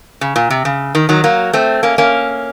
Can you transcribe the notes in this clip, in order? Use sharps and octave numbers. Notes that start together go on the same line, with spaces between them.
C#3
A#2
C3
C#3
D#3
D#3 F#3
F#3 A#3
A3 C4
A#3 C#4
A#3 C#4